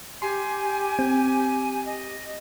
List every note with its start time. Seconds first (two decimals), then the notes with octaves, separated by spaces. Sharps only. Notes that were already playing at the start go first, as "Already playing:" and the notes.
0.22 G4 G#5 C6 C7
0.99 C4
1.86 D#5